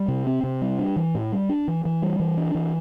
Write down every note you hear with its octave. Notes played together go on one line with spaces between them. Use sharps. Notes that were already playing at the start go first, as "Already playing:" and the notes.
Already playing: G3
C3
C4
C3
G3
D4
E3
A2
G3
D4
E3
E3
G3
E3
D4
E3